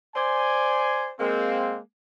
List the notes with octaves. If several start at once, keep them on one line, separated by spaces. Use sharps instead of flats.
C5 D5 G#5
G#3 A#3 C4